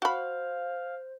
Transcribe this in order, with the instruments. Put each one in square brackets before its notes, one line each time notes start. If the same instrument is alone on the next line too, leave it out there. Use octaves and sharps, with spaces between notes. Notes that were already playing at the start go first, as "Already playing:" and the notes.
[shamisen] F#4 B5 [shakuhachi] C5 [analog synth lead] F5